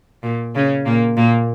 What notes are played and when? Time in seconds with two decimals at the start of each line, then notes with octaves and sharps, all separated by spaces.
0.23 A#2
0.55 C#3 C#4
0.85 A#2 A#3
1.17 A#2 A#3